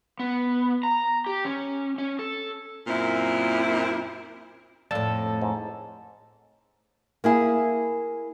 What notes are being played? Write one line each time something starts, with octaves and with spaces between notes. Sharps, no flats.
B3
A#5
G4
C#4
C#4
A4
F#2 A#2 C4 E4
F2 A2 D5 A5 E6
G#2
A#3 E4 G#4